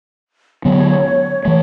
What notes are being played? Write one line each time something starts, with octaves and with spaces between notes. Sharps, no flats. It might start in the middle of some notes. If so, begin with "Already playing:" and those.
D3 F#3 B3 C#5
E3 A3